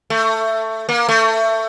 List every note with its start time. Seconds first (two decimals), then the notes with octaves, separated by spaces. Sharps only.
0.10 A3
0.89 A#3
1.09 A3